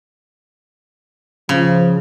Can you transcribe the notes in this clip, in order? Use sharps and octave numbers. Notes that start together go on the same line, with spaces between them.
C#3 F3